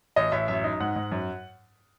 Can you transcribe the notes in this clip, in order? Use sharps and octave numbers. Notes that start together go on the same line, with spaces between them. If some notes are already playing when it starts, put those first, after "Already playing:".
A1 D#5
A1 E5
F#2 E5
D#4
G#2 F#5
G#2
F#2